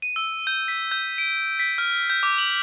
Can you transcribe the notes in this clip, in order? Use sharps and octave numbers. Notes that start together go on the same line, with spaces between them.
D#7
E6
G6
B6
G6
D7
B6
F6
G6
D6
F#7